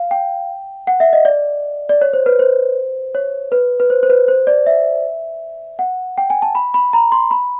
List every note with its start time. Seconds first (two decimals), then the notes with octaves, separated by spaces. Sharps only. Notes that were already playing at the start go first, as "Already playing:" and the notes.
Already playing: F5
0.11 G5
0.87 F#5
1.00 E5
1.13 D#5
1.25 D5
1.89 D5
2.01 C#5
2.13 C5
2.26 B4
2.39 C5
3.15 C#5
3.52 B4
3.80 B4
3.90 C5
4.03 C5
4.10 B4
4.28 C5
4.47 D5
4.66 E5
5.79 F#5
6.18 G5
6.30 G#5
6.42 A5
6.55 B5
6.74 B5
6.93 A#5
7.12 C6
7.31 B5